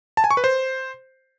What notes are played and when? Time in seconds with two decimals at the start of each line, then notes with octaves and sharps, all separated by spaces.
0.17 A5
0.24 G#5
0.31 C#6
0.37 B4
0.44 C5